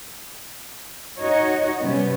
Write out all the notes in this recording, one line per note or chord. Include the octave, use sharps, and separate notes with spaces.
D#4 F#4 C#5 D#5
C3 G3 B3 C#4